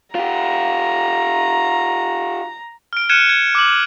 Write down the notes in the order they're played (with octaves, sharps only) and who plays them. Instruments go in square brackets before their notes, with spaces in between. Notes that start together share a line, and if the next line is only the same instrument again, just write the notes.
[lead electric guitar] F4 G4 [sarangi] A#5
[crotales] F6 D7
F6 F#6 G#6 C#7 D#7 E7
G#6
D6 F#7